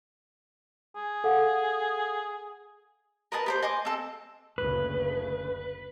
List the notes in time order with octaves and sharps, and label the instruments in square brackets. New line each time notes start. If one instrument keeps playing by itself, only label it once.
[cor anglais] G#4
[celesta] A4 F5 F#5
[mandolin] A#4 B4 D#5 A5
G4 A#4 C5
D#5 G#5 C6 D6
C4 A4
[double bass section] F#1 D2 C#3 [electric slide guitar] B4